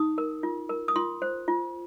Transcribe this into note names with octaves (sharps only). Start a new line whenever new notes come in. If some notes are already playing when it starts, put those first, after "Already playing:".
Already playing: D#4 D#6
A#4
F4
A#4
D#6
F4 C6
C5
F4